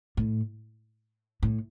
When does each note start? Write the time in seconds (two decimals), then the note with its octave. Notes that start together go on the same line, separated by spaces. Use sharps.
0.17 A2
1.43 A2